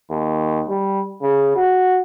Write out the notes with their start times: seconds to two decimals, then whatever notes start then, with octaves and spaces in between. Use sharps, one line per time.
0.10 D#2
0.69 G3
1.22 C#3
1.56 F#4